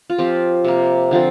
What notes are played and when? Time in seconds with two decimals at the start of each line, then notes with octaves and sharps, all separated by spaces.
0.10 F4
0.18 F3 C4 G4
0.64 C3 A#3
1.11 D3 F3 C4